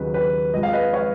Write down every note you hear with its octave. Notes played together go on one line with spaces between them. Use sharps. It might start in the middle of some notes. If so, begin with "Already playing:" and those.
Already playing: D#2 C#3 F#3 B4
B4
F2 F3 G#3 D#5
F5
B4 D#5
C#5 F5